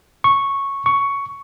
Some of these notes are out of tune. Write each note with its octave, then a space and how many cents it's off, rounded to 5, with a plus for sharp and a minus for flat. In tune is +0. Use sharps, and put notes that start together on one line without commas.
C#6 -5
C#6 +10